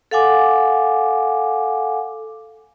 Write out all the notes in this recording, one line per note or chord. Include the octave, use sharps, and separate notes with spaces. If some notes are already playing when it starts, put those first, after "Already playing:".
A4 F5 F#5 G#5 D6